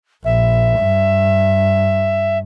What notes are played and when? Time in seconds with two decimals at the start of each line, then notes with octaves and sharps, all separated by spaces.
0.24 A#1 E5
0.79 G2